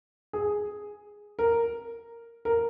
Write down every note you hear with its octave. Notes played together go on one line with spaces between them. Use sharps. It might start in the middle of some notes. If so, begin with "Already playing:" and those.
G#4
A#4
A#4